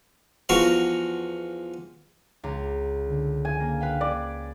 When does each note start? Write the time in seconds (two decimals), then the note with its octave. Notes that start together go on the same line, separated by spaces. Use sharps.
0.49 E2 F3 F#4 F5 A#5
2.44 C#2 A#5
3.06 D3
3.45 G#5
3.60 A#3
3.80 B4 F5 G5
4.01 D5